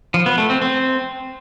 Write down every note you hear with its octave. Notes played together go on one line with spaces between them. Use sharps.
F3
B3
A3
C4
C4